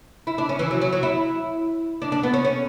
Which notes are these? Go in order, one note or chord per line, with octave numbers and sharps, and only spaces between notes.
E4
D4
C#4
E3
F#3
F#3
F#3
E4
D4
D4
B3
C#4
C#4